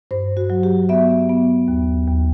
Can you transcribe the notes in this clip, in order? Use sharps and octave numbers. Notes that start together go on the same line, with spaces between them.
G2 C5
F#4
F#3
G4
B3 E5
B3
D#2
D#2